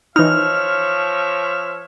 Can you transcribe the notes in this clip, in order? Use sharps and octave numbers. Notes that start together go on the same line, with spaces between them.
E3 F3 D#4 C#5 E5 F6